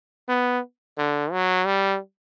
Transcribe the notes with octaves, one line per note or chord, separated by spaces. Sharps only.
B3
D3
F#3
G3